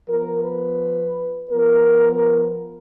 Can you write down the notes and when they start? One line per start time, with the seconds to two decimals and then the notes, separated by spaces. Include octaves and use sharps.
0.08 F3 B3 A#4
0.44 B4
1.51 F3 B3 A#4